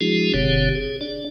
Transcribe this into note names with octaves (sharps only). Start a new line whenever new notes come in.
F3 G#3 D4 E4 F#4 G#4
F#1 B2 D3 C4 G4 C#5
G#4
D4 D5